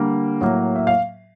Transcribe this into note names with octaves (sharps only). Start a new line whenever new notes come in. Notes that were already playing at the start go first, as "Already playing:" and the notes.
Already playing: D3 G3 A#3
A2 F#3 A#3
E5
F5